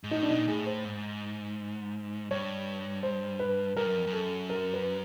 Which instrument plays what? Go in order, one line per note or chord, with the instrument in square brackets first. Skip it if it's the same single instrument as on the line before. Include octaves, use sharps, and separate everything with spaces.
[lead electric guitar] G#2
[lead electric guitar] A2 [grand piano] D#4
[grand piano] D4
[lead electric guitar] B2 [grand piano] D#4
[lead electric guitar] A#2
[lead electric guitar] A2 [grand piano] G#4
[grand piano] C5
[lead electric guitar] G#2
[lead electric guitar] G2 [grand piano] C#5
[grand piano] C5
B4
[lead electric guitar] G2 [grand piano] A#4
[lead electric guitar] F#2
F2
F#2
[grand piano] A4
A#4
B4